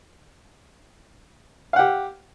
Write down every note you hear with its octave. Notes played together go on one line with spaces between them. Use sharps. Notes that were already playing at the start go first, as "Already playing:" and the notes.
G4 F5 F#5